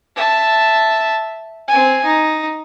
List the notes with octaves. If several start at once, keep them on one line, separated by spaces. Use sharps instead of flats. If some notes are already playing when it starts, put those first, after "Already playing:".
E5 A5
C4 G#5
D#4